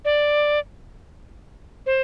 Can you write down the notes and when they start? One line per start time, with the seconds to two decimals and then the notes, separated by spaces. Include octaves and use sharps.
0.05 D5
1.86 C5